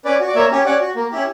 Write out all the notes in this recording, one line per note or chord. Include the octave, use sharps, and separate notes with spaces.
C#4 B4 D5
F#4
D5
A#3 C#5 E5
C#4 G4
C#4 D5 F#5
F#4
A#3
C#4 E4 G4